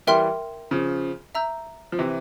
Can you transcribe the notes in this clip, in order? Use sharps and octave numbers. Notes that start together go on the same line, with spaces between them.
E3 G3 A#4 E5 G5 C6 F6
C#3 F3
E5 A#5 E6 G6
F3
C3 E3